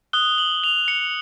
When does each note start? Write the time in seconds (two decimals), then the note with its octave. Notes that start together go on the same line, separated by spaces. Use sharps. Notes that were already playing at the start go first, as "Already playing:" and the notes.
0.13 D#6 F#6 G7
0.38 F#7
0.64 F7
0.88 C#7